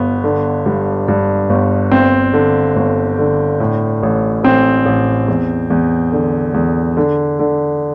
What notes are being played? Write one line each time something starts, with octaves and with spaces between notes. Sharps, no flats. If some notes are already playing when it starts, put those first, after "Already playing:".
Already playing: G1 B3
D3
G2
G2
G1
G1 C4
D3
G1
D3
A2
A1
A1 C4
A1
E2
E2
D3
E2
D3
D3